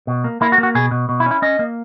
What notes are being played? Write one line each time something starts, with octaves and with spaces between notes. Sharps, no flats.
B2
A#3
A#3 E4
F#4
A#3
F#4
B2 G#4
B2
B2
E4
C#4
E4
C#4 D#5
A#3